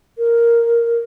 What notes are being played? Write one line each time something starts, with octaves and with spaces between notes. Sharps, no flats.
A#4